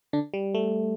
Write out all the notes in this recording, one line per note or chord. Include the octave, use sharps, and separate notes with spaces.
D3 D4
G3
A3